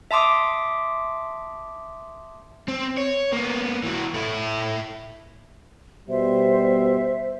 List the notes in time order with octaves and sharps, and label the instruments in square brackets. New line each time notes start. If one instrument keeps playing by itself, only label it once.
[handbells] E5 A5 C6 D6 D#6
[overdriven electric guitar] C4
C#5
A#3 B3
E3 F#4
A3 E4
[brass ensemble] B2 G3 [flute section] C5 E5